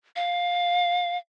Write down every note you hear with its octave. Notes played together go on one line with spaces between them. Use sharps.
F5